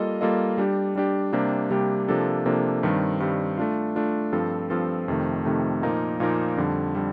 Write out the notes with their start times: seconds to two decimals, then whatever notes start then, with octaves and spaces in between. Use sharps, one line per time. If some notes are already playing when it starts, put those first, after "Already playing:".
Already playing: G3 A#3 F4 A4 D#5
0.21 G3 A#3 F4 A4 D#5
0.58 G3 D4 G4
0.95 G3 D4 G4
1.33 C3 G3 A#3 D4 G4
1.70 C3 G3 A#3 D4 G4
2.08 C3 F3 A#3 D4 A4
2.45 C3 F3 A#3 D4 A4
2.83 G2 D#3 G3 C4
3.20 G2 D#3 G3 C4
3.58 A3 D4 F4
3.96 A3 D4 F4
4.32 G2 F3 C4 F4 A4
4.70 G2 F3 C4 F4 A4
5.08 F2 C3 D#3 A3
5.45 F2 C3 D#3 A3
5.82 A#2 F3 A#3 D#4 A#4
6.20 A#2 F3 A#3 D#4 A#4
6.57 F2 D3 G3
6.95 D3 G3